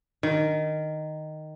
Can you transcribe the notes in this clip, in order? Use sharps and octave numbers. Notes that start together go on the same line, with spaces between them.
D#3